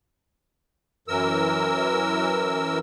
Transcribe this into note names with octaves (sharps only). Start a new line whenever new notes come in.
F#2 E3 A#4 E6